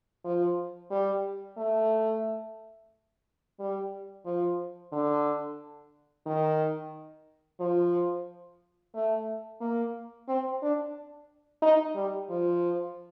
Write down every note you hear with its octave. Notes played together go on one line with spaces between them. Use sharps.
F3
G3
A3
G3
F3
D3
D#3
F3
A3
A#3
C4
D4
D#4
G3
F3